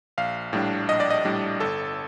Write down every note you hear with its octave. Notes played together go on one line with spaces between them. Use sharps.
A#1 F5
A2 G3 D4
A#1 D#5
D5
D#5
A2 G3 D4
G1 A4